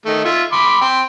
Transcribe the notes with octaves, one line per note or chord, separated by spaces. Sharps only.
D#3 A3
F4 E5
B5 C6 D6
G5 C6